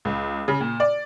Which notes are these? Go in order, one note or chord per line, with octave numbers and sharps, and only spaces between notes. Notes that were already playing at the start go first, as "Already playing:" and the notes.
C#2
C#3
A#2
D5